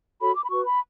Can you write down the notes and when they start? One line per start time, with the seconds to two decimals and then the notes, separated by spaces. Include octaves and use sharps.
0.20 F#4 A4 C#5 B5
0.35 D6
0.44 B5
0.50 F#4 B4 C#6
0.66 B5